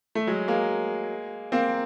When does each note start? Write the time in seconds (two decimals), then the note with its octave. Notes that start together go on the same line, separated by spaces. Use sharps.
0.15 A3
0.27 F#3 G#3
0.48 G#3 A#3
1.52 A#3 C4